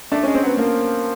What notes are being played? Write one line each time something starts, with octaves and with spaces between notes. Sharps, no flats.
A3 D4
C#4
G#3
C4
F#3 B3
F3 A#3